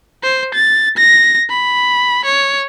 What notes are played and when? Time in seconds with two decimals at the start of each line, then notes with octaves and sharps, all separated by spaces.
0.23 C5
0.54 A6
0.97 A#6
1.50 B5
2.25 C#5